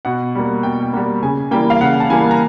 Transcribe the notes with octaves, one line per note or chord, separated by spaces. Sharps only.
B2 F#5
G3 A#3
B2 G5
G5
G3 A#3 F#5
C#3 G#5
E3 G3 A#3 G5
F5
C#3 F#5
A5
E3 G3 A#3 G#5
A#5